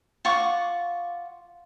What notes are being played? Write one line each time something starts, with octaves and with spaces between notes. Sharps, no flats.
F4 F#5 C#6 D6